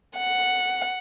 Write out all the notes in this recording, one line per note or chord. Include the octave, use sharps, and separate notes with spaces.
F#5